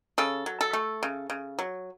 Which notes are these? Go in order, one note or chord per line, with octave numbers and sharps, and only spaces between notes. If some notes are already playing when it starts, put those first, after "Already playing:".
C#3 A4
F#3
A4
A3
C#3
C#3
F#3